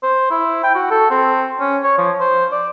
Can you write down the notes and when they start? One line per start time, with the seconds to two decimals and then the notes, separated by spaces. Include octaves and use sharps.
0.03 C5
0.31 E4
0.63 G5
0.75 F#4
0.91 A4
1.10 C4
1.60 C#4
1.83 C#5
1.98 F3
2.20 C5
2.52 D5